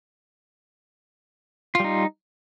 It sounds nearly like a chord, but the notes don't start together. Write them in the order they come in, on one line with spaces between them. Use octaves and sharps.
F4 G3 D#4